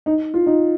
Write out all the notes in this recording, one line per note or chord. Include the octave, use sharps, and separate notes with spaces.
D#4
F4
D#4